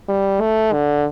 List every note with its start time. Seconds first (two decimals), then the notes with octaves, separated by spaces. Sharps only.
0.09 G3
0.41 A3
0.73 D3